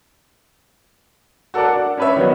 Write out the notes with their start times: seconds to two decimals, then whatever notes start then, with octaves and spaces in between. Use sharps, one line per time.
1.54 F#4 A4 A#4 D5 F#5
1.73 D4
1.98 C#4 D4 B4 C#5 E5
2.16 D#3 F#3 B3